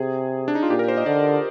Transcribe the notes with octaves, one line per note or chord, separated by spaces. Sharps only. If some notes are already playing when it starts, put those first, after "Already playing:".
Already playing: C3 G#4
D4
D#4
F4
A#2 G4
A#4
C5
D#5
D3 D5